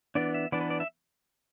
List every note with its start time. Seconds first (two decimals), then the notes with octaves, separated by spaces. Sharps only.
0.15 E3 B3 D4 D5
0.34 E5
0.52 E3 B3 D4 D5
0.61 B4
0.70 D5
0.80 E5